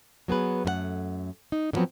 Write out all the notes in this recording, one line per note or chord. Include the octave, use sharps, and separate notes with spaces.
F#3 B3 G#4 B4
F#2 A3 A#4 F#5
D#4
D3 F3 F#3 B3 C4